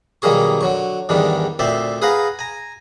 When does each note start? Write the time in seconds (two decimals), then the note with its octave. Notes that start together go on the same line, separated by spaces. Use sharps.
0.22 B1 D#3 G3 A#3 G#4 C#6
0.61 D3 F#3 C#6
1.09 E2 G#2 D#3 G3 D4
1.59 D2 A#2 C4 D5 E5 C6
2.02 G#4 B4 F5 F#5 A#5
2.39 G#5 A#5